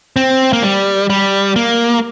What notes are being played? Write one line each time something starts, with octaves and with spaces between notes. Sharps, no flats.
C4
A#3
G3
G3
A#3